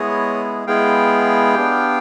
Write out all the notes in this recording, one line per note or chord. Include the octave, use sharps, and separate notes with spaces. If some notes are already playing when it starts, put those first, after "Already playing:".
Already playing: G#3 B3 E4 G#4 C#5 D#5
G#3 B3 E4 G#4 F5 G5
B3 D4 G4